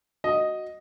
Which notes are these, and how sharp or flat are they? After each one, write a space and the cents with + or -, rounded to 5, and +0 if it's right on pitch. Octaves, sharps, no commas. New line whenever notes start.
F#4 +0 D#5 +0